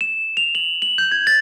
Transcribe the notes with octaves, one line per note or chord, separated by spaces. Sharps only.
E7
F7
F#7
F#7
G6
G#6
A6